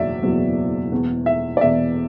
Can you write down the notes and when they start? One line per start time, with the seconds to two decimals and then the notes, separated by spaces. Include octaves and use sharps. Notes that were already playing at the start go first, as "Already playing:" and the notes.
Already playing: F#1 E2 B2 F#3 D5 E5
0.22 F#1 E2 B2 F#3
0.91 E1 E2 B2
1.26 E5
1.57 D5
1.61 E1 E2 B2 E5